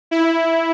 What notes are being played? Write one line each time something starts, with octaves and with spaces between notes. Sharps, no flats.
E4